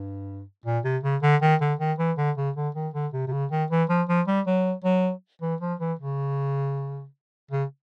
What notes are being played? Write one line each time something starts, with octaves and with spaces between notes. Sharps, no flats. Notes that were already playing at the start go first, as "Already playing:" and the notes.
Already playing: G2
A#2
C3
C#3
D3
D#3
D3
D#3
E3
D3
C#3
D3
D#3
D3
C3
C3
C#3
D#3
E3
F3
F3
G3
F#3
F#3
E3
F3
E3
C#3
C#3